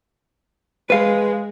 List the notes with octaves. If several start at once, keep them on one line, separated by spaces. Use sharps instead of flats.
G#3 B4 F5